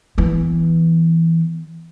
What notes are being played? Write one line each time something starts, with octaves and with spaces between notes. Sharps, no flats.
E3 B3